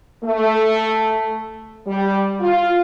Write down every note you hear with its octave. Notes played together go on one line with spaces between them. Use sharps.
A3
G3
F4